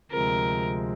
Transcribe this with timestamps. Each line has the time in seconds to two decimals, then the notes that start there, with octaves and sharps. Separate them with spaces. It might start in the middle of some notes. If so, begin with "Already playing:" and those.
0.11 D2 C3 F3 G#3 C4 A#4